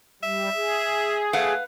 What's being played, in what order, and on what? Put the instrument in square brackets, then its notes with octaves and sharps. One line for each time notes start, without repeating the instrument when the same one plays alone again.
[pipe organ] G3 [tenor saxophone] E5
[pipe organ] G#4
[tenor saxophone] A3 [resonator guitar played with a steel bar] B4 F5 F#5